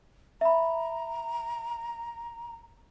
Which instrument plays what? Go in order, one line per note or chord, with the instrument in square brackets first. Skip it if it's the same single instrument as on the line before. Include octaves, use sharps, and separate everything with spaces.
[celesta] E5 B5 [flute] A#5